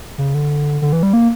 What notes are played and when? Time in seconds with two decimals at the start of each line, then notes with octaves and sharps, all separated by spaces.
0.18 C#3
0.34 D3
0.82 D3
0.93 E3
1.03 G3
1.13 A#3